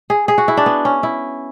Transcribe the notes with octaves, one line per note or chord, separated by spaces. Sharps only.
G#4
G#4
F#4
E4
D4
B3
C#4
E4